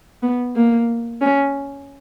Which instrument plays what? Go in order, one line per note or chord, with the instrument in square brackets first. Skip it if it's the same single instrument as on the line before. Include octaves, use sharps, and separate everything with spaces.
[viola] B3
A#3
C#4